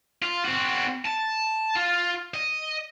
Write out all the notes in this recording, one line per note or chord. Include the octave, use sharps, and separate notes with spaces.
F4
C4 F#4
A5
F4
D#5